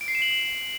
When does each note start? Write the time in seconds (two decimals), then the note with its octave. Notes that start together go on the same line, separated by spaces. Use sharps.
0.01 D7
0.08 C7
0.15 E7
0.22 F#7